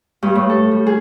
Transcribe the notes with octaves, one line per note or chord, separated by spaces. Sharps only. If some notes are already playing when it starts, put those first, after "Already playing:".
G2
A2
A4
G3
G#4